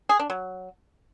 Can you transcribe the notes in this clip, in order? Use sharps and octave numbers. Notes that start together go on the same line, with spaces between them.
G#4
D4
F#3